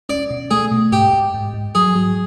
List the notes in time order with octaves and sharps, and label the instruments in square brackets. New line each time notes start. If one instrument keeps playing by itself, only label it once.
[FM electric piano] C#4 [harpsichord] D5
[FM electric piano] B2
[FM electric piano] A3 [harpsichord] G#4
[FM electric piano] B2
[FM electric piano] G#2 [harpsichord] G4
[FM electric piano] G#2
G#2
G#2
[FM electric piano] F#3 [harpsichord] G#4
[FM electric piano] F#3